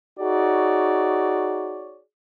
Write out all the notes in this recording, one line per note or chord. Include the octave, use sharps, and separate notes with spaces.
D#4 F#4 G#4 C#5 D5